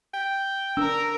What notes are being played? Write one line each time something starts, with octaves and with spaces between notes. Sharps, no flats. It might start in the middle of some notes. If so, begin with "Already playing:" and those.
G5
D4 A#4 E6